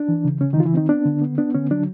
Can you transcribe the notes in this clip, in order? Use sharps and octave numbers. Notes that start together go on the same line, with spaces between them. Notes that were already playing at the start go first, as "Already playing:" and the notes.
Already playing: D4
E3
C#3
C#3 C#4
D#3 E3 D#4
F4
E3 E4
D#3 C4 D#4
B3 D4
D3
B3
B3 D4
D3 C#4
F#3 D4